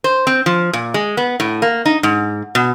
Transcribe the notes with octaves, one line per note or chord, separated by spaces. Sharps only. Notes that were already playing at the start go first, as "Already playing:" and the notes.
C5
C4
F3
A#2
G#3
B3
A2
A#3
D#4
G#2
B2